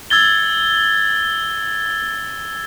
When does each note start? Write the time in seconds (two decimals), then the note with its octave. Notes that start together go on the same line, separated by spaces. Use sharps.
0.10 E6 G#6 A6 G7